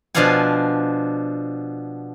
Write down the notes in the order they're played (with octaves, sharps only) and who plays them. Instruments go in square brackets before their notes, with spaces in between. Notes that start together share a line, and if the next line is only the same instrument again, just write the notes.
[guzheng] B2 F3 D4 F5 F#5 G#5